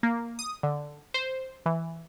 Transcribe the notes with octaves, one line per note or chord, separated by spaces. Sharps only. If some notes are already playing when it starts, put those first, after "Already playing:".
A#3
D#6
D3
C5
E3